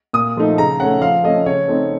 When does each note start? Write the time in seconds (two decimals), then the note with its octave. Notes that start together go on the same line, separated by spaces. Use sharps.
0.13 A#2 D#6
0.37 F3 A3 D#4
0.57 C#3 A#5
0.80 A3 C#4 F#5
1.02 F3 F5
1.24 A3 C#4 D#5
1.46 C#3 C#5
1.68 A3 C4 D#4